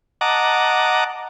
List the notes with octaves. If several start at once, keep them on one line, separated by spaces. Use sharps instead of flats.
D#5 F#5 A5 A#5 D6